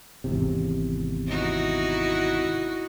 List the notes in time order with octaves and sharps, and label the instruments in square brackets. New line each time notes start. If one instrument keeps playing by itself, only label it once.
[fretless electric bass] G#1 E2 C3
[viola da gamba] D#4 E4 F#4